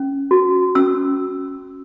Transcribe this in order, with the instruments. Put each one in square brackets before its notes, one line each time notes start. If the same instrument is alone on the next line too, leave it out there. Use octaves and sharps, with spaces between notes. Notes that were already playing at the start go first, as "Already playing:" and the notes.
Already playing: [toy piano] C#4
F#4
C#4 E6